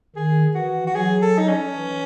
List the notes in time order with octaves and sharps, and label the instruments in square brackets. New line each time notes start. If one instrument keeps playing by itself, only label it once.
[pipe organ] D#3 [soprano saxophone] G#4
[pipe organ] E3 [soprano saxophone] F#4
[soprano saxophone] F#4
[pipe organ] F#3 [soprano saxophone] G#4
[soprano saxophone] A4
D#4
C#4
[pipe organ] E3